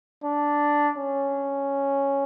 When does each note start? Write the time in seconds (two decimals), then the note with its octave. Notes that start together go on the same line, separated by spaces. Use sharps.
0.24 D4
0.98 C#4